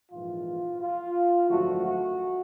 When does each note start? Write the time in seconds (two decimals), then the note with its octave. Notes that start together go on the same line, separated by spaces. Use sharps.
0.11 A#1 G#2 E3 F4
0.81 F4
1.49 G#1 F#2 D3 F3 A3 F#4
1.84 F#4